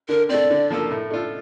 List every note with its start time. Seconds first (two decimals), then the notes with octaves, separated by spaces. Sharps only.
0.09 D3 A#4
0.29 A3 C4 D5
0.50 D3
0.70 F3 A#3 F4 A4
0.91 A2
1.10 A3 D4 F4 A4